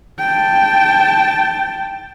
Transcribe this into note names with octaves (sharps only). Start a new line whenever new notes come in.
G5 A5